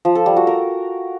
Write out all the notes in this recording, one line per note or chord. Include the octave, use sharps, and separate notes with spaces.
F3
A4
G3
F#4
A#4